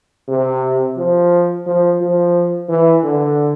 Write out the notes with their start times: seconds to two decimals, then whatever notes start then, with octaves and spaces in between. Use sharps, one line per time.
0.28 C3
0.97 F3
1.66 F3
2.01 F3
2.69 E3
3.03 D3